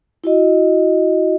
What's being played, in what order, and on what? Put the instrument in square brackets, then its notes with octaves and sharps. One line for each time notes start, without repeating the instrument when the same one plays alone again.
[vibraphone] E4 F#4 D#5